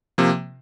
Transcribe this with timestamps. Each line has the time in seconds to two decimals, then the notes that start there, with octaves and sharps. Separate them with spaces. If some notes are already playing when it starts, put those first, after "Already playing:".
0.18 C3 F3 A#3